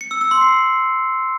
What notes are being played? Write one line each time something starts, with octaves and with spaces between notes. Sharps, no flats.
C#7
E6
E6
C6
C7